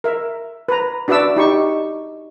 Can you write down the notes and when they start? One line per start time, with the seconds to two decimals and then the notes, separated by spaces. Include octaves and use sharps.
0.04 A#4 E5
0.68 B4 A#5
1.08 D4 F#4 B4 D5 E5 E6
1.36 D#4 G4 C#6